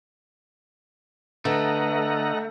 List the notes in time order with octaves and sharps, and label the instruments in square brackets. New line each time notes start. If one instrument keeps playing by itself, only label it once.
[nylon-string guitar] D3 [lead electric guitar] A3 [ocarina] B4 [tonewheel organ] D#5 F#5 A#5